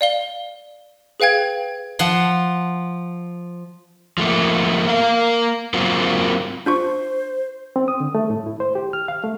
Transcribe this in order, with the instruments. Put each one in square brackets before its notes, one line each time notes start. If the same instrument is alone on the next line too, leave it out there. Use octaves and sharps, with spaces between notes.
[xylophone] D5 F5 G7
G#4 B4 F5 G5 G#6
[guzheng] F3 F#5 C6
[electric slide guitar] F3 A3 A#3
A#3 A#4 F5
F#3 A#3 C4 F4
[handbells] D4 F4 C#6 [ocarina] C5
[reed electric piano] C4
D#6
D3
A3
A2
E4
C5
G4
F6
F5
A3